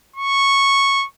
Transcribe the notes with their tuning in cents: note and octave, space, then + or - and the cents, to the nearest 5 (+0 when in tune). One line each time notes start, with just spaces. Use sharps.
C#6 -10